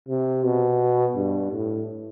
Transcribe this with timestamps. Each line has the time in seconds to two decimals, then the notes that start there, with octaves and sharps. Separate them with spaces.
0.09 C3
0.44 B2
1.16 G2
1.52 A2